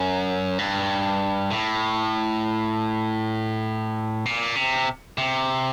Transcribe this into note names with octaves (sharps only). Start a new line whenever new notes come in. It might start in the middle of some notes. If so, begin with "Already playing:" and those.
Already playing: F#2
G2
A2
A#2
C3
C3